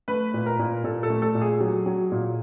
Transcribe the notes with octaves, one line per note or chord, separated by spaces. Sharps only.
A3 B4
A#2
A#4
A#2
A#2 A4
A4
A3
A4
A#2
G#4
F#3
F#3
A#2